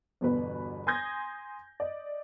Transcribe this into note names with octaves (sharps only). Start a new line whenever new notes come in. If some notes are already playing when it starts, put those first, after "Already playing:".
G1 E2 B2 B4 B5
G#5 C6 D#6 G6 G#6 A#6
D5 D#5